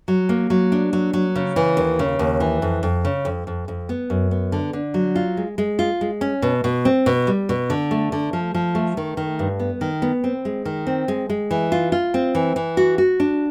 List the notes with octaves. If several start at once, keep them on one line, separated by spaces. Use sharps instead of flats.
F#3
A#3
F#3
D4
F#3
F#3
C#3
E3
D#2
C#3
D#2
E3
F2
F2
C#3
F2
F2
F2
B3
F#2
B3
D3
D3
F#3
F4
G#3
G#3
F4
G#3
C#4
B2
B2
C4
B2
G3
B2
D3
A3
D3
F3
F3
A3
D#3
D#3
G2
B3
D#3
B3
C4
G#3
D#3
C4
G#3
G#3
E3
F4
F4
C4
E3
E3
F#4
F#4
D4